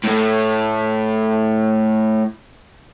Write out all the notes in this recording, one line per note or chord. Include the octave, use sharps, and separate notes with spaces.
A2 A3